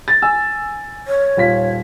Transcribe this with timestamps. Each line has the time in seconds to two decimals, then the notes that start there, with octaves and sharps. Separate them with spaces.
0.08 A6
0.22 G#5 E6
1.08 C#5
1.37 D#1 F4 B6